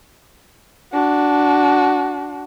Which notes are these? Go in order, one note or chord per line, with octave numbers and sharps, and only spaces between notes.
D4 F#4